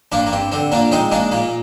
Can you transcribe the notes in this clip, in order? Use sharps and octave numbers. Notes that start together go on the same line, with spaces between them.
G2 A#3 D4
A#3
G2 C4
D3 C4
A#2 A#3 D4
G#3 C4 D#4
G#3 A#3 D4
A#2 A#3